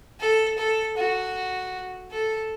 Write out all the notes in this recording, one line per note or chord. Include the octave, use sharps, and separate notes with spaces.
A4
A4
F#4
A4